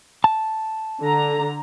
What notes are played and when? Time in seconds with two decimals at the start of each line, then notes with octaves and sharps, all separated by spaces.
0.24 A5
1.00 D3 A#5